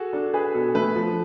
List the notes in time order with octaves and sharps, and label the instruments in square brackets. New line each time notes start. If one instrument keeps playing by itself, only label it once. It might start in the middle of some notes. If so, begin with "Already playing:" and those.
Already playing: [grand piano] F#4 G#4 A4
[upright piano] D4 [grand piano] A4
[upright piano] G#4 [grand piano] B4
[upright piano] B2 [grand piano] A4
[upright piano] A3 [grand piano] B4
[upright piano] F3 [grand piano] A4